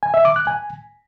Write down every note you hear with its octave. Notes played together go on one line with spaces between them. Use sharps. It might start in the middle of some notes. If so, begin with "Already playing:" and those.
G#5
E5
D6
F#6
G#5